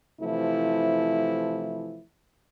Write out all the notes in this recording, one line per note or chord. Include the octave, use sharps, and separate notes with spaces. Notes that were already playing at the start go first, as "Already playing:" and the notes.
C3 E3 F3 A3 E4